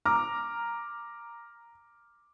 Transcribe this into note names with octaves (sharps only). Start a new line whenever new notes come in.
A#5 D6 F6